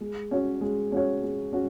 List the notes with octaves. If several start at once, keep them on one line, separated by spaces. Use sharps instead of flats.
G#3
C#4 F#4 C#5
G#3
C#4 F#4 C#5
G#3
C#4 F#4